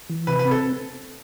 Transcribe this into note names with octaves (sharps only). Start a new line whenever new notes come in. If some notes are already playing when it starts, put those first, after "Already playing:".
E3
C3 B4
B4
C4
A4